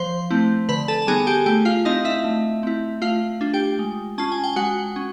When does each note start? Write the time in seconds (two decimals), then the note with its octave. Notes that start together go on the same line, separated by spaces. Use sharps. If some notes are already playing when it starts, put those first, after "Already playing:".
Already playing: F3 C5 C6
0.30 A3 C4 E4
0.69 D3 B4 B5
0.88 A4 A5
1.02 A5
1.07 G3 B3 D#4 G#4 G#5
1.27 G4 G5
1.46 A3 G4 G5
1.65 F4 F5
1.85 C4 D#4 E4 D#5
2.05 E4 E5
2.24 A3
2.63 C4 E4
3.01 A3 F4 F5
3.41 D4 F4
3.53 G4 G5
3.79 G#3
4.18 C#4 F4 A5
4.32 G#5
4.44 G5
4.56 G#3 F#4 F#5
4.96 C#4